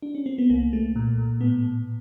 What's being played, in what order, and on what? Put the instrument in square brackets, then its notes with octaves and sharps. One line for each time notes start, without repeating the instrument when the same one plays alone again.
[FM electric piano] D4
C#4
C4
B3
C2 A#3
A3
A#2
A#2
A2 B3
A2